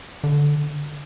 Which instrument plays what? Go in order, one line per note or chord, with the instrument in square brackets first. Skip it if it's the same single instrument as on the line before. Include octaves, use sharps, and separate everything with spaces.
[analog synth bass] D3